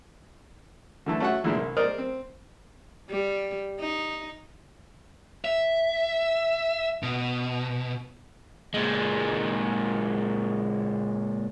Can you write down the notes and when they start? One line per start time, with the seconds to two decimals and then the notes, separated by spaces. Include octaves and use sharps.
1.06 D3 E3 A3
1.20 A3 C#4 F#4 E5 F#5
1.44 A#2 D3 E3 G#3
1.57 C2
1.77 A#4 C5 D5 D#5 D#6 F6
1.98 C4
3.10 G3
3.80 D#4
5.45 E5
7.03 B2
8.74 A#2 G#3